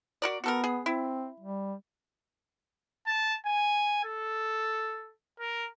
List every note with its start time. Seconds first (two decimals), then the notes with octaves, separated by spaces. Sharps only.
0.22 F#4 A#4 D5
0.44 B3 F#4 A4 A#4
0.64 G#4
0.86 C4 E4
1.40 G3
3.06 A5
3.45 G#5
4.04 A4
5.40 A#4